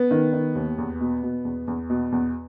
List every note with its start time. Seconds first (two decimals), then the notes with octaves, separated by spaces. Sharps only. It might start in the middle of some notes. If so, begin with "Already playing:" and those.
Already playing: B3
0.11 D#3
0.33 D#3
0.55 D#2
0.78 E2
1.01 B2
1.23 B2
1.45 E2
1.68 E2
1.90 B2
2.12 E2